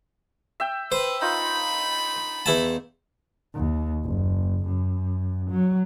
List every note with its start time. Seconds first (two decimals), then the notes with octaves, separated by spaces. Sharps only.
0.60 E5 G5
0.92 B4 C5
1.22 D#4 F4 B5
2.46 E2 E4 A5
3.55 D#2
4.03 F#1
4.66 F#2
5.51 F#3